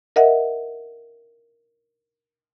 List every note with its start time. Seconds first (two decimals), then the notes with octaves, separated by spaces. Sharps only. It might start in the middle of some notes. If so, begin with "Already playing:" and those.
0.16 A#4 D#5 E5 F#5